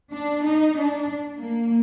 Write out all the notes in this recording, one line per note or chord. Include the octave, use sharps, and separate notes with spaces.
D4
D#4
D4
A#3